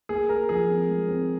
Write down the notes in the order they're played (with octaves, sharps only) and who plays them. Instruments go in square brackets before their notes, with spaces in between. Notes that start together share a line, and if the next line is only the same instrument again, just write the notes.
[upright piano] A#3 [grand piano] G#4
[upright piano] A#3 [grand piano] A#4
[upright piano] F3 [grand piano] G#4
[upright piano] C4
G#3
C4